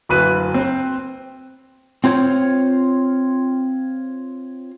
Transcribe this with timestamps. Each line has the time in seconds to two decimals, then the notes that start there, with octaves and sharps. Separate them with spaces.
0.09 F#1 D2 B4 F#6 D#7
0.54 C4 C5
2.04 C4 F4 C5 C#5